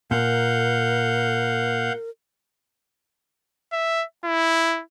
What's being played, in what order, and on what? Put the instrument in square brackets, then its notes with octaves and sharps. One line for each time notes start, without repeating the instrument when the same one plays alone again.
[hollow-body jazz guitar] A#2 [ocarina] A#4 [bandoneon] F5 F#5 G6
[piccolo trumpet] E5
E4